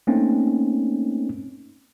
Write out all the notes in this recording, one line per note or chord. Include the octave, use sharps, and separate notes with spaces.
A3 A#3 C4 C#4 D#4